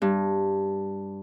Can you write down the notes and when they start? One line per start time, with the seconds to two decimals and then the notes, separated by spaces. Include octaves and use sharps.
0.02 G2